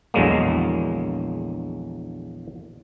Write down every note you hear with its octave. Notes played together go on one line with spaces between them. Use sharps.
A#1 E2 D3 F#3 G#3 A#3